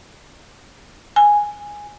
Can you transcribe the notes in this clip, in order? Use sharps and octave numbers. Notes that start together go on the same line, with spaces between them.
G#5